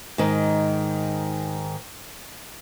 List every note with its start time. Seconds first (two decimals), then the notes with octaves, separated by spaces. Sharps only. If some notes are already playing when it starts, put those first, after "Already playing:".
0.18 G#2 D#3